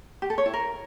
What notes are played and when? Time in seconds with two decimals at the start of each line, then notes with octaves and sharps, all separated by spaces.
0.22 G4
0.30 A4
0.38 C#5
0.46 E4
0.53 A#4